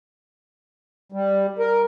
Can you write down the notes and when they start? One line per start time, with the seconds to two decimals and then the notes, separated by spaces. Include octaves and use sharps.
1.12 G3
1.59 A#4